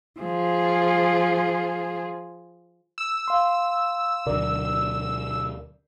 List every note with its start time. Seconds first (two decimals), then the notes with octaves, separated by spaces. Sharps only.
0.19 F3 G#4
2.98 E6
3.28 F5 C6
4.26 D2 B2 D3 F#3 A#4 D5